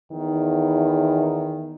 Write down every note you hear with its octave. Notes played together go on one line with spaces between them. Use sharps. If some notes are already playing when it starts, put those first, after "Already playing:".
E2 D#3